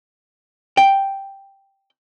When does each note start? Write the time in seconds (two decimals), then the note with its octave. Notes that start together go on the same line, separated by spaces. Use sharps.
0.77 G5